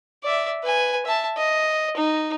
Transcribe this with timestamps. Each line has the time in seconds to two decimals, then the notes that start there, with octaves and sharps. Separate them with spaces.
0.24 D5 E5
0.64 B4 G#5
1.06 E5 A5
1.37 D#5
1.96 D#4